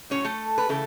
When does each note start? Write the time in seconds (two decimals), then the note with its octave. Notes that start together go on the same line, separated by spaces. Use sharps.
0.10 A2 F#3 C#4 C#5
0.25 A3 A4
0.58 B4
0.69 C#3 E3 A3 A4